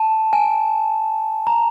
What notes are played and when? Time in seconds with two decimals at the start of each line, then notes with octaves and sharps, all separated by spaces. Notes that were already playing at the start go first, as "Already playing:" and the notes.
Already playing: A5
0.33 G#5
1.47 A#5